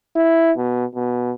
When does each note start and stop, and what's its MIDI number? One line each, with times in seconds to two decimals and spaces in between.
0.16 0.52 64
0.57 0.85 47
0.95 1.32 47